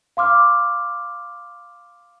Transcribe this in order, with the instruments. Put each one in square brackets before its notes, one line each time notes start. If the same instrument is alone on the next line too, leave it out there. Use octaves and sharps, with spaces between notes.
[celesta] F5 C6 D6 F6